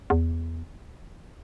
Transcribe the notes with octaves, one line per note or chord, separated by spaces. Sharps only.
E2